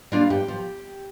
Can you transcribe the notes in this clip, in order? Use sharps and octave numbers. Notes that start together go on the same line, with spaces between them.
G3 A#3 D4 F4 F5
G2 G4
F3